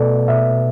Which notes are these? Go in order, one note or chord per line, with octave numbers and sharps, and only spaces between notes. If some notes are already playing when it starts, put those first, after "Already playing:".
Already playing: B2 A3 D5
B2 E5